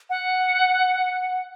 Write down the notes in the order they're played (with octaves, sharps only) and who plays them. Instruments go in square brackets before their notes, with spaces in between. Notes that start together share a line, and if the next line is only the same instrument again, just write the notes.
[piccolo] F#5